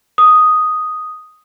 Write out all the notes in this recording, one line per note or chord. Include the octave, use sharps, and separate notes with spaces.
D#6